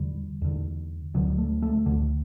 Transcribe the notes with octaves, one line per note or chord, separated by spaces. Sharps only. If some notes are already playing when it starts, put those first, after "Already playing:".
Already playing: E2 D3 G3
E2 D3
D2 D3 F#3
A3
A3
D2 D3